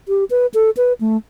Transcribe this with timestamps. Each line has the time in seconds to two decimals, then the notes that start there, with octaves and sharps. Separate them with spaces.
0.08 G4
0.30 B4
0.54 A4
0.77 B4
1.01 A3